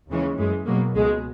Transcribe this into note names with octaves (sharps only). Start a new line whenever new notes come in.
D#2 C#3 E3 G#3 C#4
F#2 E3 G#3
B2 F#3 A#3
C#2 B2 G#3